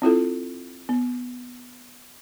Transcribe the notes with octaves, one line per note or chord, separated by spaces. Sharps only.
C4 E4 F4 A4
B3